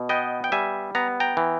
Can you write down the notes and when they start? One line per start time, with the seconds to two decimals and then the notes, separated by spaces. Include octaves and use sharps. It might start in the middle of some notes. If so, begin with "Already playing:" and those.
Already playing: B2
0.09 B3 D#5 G5
0.44 G5
0.52 G3 E5 G#5
0.95 B3 A#5
1.20 G5 A#5
1.37 E3